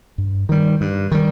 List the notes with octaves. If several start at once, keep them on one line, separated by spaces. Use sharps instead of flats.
G2
D#3 G3
G2
D#3 G3